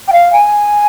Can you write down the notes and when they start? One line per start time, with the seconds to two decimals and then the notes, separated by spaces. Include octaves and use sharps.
0.08 G5
0.13 F5
0.33 G#5